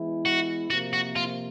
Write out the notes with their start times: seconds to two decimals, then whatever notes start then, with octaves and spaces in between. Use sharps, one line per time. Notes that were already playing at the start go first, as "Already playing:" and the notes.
Already playing: E3 G#3 B3 E4
0.25 F#4
0.70 C3 F3 A#3 F#4
0.93 F#4
1.16 F4